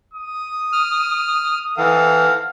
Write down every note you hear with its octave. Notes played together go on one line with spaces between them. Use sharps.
D#6
F6
E3 A4 F5 F#5